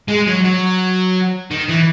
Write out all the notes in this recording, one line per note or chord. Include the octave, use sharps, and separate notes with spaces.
G#3
F#3
F#3
D#3
E3